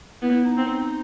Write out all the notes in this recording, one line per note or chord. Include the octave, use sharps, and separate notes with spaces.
B3 E4
E4
D#4
C4